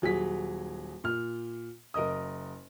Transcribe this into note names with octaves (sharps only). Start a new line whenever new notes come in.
D#1 F#3 G#4 B6
A#2 F6
F#1 A#4 D#5 D#6